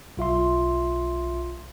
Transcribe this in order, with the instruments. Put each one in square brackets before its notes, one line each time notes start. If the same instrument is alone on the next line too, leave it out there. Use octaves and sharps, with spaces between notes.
[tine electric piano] B1 F4 E5 C6